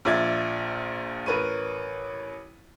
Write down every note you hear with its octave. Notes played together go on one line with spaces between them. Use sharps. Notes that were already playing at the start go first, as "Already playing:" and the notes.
A#1 A#2 D5 E5 G#6
A1 A#4 B4 C#5 D#7